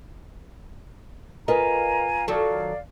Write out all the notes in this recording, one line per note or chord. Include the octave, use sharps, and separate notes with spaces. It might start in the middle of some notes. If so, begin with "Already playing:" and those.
F4 A#4 B4 D#5 F5 G#5 A#5
D#3 F#3 A4 D5 F5